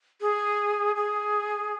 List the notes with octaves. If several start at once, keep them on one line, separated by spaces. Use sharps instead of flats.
G#4
G#4